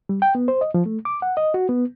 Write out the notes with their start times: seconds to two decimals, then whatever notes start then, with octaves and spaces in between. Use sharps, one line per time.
0.09 G3
0.22 G5
0.35 B3
0.48 C5
0.61 D#5
0.74 F3
0.86 A3
1.05 D6
1.22 F#5
1.37 D#5
1.54 F#4
1.69 B3